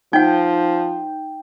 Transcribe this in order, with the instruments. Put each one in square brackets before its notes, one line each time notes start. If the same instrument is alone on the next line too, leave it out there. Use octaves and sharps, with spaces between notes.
[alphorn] F3 [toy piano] D#4 F#5 [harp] G5